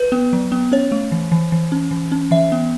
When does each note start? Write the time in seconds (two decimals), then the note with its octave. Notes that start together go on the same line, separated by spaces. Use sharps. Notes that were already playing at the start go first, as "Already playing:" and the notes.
Already playing: B4
0.12 B3
0.33 F#3
0.52 B3
0.72 C#4 C#5
0.92 A3
1.12 E3
1.32 E3
1.52 E3
1.72 C#4
1.91 E3
2.12 C#4
2.31 E3 E5
2.52 B3